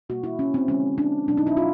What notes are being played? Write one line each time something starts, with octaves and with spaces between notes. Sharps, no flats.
B2 G3 A#3 F#4
E4
C#4
C4
D3 F3 G#3 C#4
D4
B2 F#3 A3 D4
D#4
E4
F4